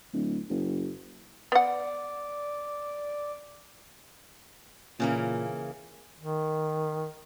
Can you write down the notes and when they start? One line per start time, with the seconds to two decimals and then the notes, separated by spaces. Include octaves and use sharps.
0.13 D1
0.50 F#1
1.52 B3 D5 F#5
5.00 A#2 C#3 E3 A#3
6.18 D#3